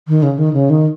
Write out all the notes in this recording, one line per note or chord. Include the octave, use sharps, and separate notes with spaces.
D#3
C#3
D#3
C#3
D#3